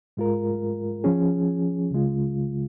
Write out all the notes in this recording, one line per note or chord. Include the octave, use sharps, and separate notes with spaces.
G#2 G#3 F4 A#4
F3 C#4 G#4
C#2 C#3 G#3 F4